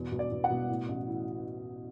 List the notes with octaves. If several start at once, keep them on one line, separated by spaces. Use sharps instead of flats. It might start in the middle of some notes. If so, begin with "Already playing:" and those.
Already playing: E2 B2
B2
D5
B2
F#5
B2
A2
A1
E3